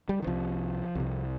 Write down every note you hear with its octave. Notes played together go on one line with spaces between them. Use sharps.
G3
D#3
C2 C3 F3
C2 C3